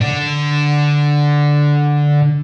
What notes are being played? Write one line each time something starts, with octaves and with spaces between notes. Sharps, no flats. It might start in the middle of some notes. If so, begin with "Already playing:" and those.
D3 D4